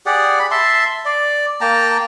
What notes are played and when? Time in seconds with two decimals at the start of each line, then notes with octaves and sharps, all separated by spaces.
0.06 G4 G#4 D5 F#5
0.39 B5
0.51 E5 A5 C6
1.05 D5
1.61 A#3 G5 A5 A#5